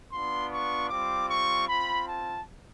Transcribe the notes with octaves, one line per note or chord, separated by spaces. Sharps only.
B3 D4 F4 C6
C#6
G3 C4 F4 D6
C#6
C4 F4 B5
A5